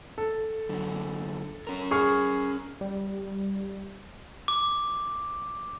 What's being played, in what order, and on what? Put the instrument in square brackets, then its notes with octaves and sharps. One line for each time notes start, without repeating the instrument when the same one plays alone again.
[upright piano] A4
[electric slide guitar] F#2 D3
C#4 A#4
[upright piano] G#4 C#6 F6
[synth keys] G3
[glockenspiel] D6